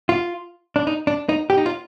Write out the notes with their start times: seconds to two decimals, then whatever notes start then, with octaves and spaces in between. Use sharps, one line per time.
0.09 F4
0.76 D4
0.87 D#4
1.07 D4
1.29 D#4
1.50 G4
1.57 D#4
1.66 F4